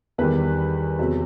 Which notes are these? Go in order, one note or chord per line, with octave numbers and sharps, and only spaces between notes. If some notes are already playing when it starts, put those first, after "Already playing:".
E2 D#3 G3 B4
E2 C3 F#3